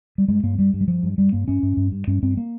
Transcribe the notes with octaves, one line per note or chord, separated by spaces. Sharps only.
G3
G2 G#3
G2 A#3
G2 G3
G2
G3
G2 F3
G2
G2 G3
G2 A#3
G2 C#4
G2
G2
G2
G2 C#4
G2 C4
A#3